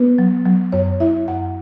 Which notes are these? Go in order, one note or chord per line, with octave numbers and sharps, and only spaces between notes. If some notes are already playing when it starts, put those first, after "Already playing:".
Already playing: B3 B4
F#3
F#3
F#2 C#5
E4 E5
F#2 F#5